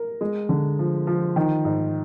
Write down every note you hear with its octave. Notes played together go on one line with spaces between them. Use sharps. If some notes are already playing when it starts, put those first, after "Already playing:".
Already playing: A#4
G#3
D3
F3
F3
D#3
G#2